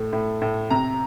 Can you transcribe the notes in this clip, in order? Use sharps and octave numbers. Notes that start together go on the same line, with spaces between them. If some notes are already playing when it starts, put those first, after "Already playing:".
Already playing: A2 A3
A2
A2
C3 A#5